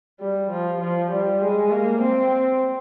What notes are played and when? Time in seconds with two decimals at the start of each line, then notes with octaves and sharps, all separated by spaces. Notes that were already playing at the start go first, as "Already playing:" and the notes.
0.20 G3
0.51 F3
0.80 F3
1.11 G3
1.41 G#3
1.71 A#3
2.01 C4